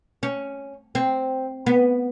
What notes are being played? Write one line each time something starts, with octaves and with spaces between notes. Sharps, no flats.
C#4
C4
B3